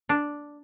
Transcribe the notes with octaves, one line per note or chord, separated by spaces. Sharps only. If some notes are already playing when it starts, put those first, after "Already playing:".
D4